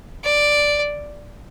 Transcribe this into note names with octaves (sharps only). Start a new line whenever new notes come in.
D5